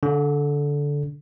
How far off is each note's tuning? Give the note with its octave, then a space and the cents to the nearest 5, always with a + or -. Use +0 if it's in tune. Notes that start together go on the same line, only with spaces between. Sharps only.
D3 -15